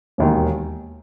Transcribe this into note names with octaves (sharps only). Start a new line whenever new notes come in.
E1 D#2 D#3